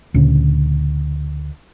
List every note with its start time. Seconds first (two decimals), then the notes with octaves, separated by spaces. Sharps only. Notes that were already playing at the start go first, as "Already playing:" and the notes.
0.14 D2 A#2 C#3 C#4